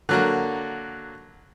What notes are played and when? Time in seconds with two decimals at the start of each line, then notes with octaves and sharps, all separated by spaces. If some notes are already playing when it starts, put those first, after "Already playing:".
0.09 D3 F#3 A#3